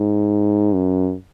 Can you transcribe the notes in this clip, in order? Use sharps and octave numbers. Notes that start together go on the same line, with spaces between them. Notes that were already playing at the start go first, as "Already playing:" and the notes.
Already playing: G#2
F#2